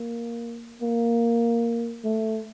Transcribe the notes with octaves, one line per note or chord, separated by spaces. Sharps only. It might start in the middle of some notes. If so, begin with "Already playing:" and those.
Already playing: A#3
A#3
A3